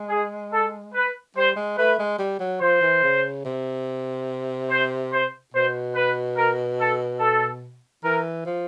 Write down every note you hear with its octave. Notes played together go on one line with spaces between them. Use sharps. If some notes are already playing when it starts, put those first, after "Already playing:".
Already playing: G#3
G#4
A4
B4
G3 C5
G#3
A3 B4
G#3
G3
F#3
F3 C5
E3
C#3
C3
C5
C5
B2 C5
B4
A#4
A4
A4
E3 A#4
F3